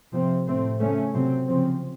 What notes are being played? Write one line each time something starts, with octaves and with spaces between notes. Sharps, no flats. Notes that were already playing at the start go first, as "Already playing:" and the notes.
C3 F3 C4
A2 A3 C4
C#3 A3 C#4
C3 F#3 C4
C#3 F3 C4